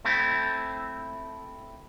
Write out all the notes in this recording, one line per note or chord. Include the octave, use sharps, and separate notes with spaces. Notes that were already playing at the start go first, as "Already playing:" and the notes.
A3 C4 E4